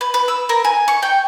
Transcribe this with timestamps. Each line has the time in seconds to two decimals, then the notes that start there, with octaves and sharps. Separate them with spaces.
0.01 B4
0.14 B4
0.28 E6
0.49 A#4
0.65 G#5
0.88 C#6
1.03 G5